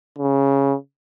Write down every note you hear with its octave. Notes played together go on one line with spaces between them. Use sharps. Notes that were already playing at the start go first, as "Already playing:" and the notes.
C#3